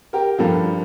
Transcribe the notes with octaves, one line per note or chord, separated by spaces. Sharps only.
G4 A#4
G2 F3 A#3 A4